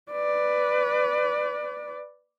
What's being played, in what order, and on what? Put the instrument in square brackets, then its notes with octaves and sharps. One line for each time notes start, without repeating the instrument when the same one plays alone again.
[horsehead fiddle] B4 D5